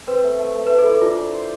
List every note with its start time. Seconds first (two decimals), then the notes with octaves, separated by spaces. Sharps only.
0.07 C4 B4
0.24 A3
0.39 A3
0.55 A3
0.67 A3 B4
0.78 A4
0.85 E4
0.90 A4
1.02 D4 F4
1.17 D4
1.33 C5